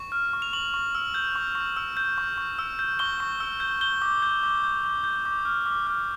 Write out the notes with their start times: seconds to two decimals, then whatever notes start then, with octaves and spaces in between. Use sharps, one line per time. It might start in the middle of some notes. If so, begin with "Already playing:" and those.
Already playing: C#6
0.12 F6
0.33 C#6
0.42 F7
0.53 C#6 F#7
0.74 C#6
0.95 E6
1.14 G6
1.35 C#6
1.55 C#6
1.76 E6
1.97 G6
2.18 C#6
2.38 C#6
2.59 E6
2.79 G6
2.99 C#6 G7
3.20 C#6
3.40 E6
3.60 G6
3.81 G6 G7
4.02 D6
4.22 G6
4.43 D6
4.64 G6
4.84 D6
5.04 G6
5.25 D6
5.45 F6
5.66 D6
5.87 F6